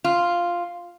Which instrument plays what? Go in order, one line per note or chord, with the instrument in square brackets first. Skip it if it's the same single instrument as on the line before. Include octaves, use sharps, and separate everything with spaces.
[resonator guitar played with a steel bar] F4